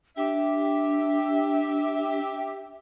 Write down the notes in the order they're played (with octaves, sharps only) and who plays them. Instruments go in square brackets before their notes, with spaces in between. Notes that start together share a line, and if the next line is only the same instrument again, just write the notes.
[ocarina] D4 [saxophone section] G4 E5